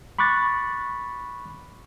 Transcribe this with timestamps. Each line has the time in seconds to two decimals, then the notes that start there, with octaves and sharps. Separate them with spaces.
0.19 B5 C#6 D6 F#6 A6